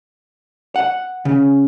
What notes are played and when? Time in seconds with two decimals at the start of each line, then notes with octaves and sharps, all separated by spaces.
0.76 F#5
1.25 C#3